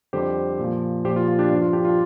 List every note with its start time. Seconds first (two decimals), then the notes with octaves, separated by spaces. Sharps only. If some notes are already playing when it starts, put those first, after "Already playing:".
0.13 F2 D3 G3 G4 C5
0.59 A#2 F3
1.05 A#2 F3 G4 C5
1.16 F4
1.28 F4
1.39 D4 G4
1.50 G2 D4
1.54 F3
1.62 F4
1.73 D4 G4
1.85 F4